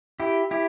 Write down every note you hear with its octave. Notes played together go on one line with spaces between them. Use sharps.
E4 G4
E4 G4